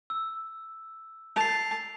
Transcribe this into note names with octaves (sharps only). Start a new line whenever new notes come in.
E6
A5 C7 F7